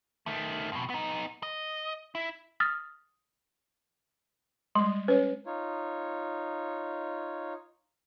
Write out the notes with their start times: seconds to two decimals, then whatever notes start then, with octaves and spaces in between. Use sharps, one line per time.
0.26 D#3 A3
0.72 F2 B2
0.90 B3 D#4
1.43 D#5
2.15 E4
2.60 D#6 F6 A6
4.75 G3 G#3 C6
5.08 C#4 B4 C#5
5.46 D#4 F4 C#5